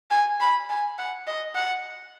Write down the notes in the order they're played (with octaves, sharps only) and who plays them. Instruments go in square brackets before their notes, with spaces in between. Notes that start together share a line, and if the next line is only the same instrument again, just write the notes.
[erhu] G#5
B5
G#5
F#5
D#5
F#5